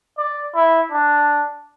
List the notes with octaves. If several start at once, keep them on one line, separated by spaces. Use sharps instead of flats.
D5
E4
D4